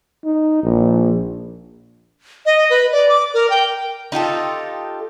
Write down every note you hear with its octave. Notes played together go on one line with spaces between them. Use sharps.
D#4
A#1
D#5
B4
D5
D6
A#4
G5
D#4 F4 G4 A4